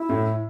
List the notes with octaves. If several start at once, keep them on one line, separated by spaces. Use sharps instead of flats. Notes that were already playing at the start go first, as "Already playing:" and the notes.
Already playing: E4
A2